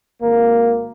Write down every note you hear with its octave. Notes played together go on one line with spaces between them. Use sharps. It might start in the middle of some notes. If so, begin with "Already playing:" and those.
G#1 A#3